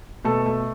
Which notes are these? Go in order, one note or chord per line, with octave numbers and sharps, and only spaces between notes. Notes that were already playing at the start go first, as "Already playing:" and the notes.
B2 A3 A4
A3